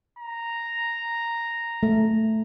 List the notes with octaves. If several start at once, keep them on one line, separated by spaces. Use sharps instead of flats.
A#5
A3